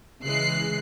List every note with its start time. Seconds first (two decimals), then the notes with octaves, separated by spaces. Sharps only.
0.24 C#3 E3 G#3 F#6 C7